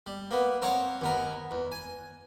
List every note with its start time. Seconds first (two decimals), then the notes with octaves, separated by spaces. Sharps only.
0.06 G3
0.31 A#3 B3
0.62 C4 A#4 C#5 F5 F#5
1.01 D#2 B3 A#4
1.51 E2
1.72 G#5